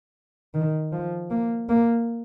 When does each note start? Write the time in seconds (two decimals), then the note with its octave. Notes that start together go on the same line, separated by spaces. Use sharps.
0.54 D#3
0.93 F3
1.30 A#3
1.69 A#3